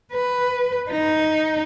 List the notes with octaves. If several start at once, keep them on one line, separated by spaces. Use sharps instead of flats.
B4
D#4